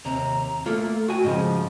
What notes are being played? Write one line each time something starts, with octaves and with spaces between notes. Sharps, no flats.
D#2 C3 A#5
A3 A#3 F4 A4
F#4 G5 G#5
G#2 C#3 F3 D#5